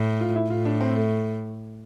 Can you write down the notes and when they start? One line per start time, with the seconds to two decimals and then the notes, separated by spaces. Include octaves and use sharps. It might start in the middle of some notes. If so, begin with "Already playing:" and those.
Already playing: A2
0.21 F4
0.36 E4
0.50 A2 F4
0.65 D4
0.81 C4
0.96 A3